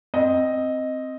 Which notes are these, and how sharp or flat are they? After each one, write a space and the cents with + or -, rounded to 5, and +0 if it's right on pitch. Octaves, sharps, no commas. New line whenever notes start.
C4 +0 D#5 +0